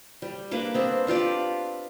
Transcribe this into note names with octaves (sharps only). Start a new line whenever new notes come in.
G3
A#3 D4 B4 D6
B3 C4
D4 F4 G4 D5